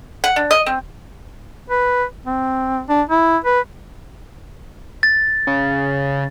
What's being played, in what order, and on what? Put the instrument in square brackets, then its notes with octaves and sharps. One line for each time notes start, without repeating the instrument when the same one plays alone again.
[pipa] F#5
D4
D#5
C4
[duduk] B4
C4
D4
E4
B4
[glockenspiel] A6
[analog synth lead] C#3